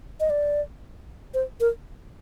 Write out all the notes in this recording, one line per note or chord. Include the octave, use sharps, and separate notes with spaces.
D#5
D5
C5
A#4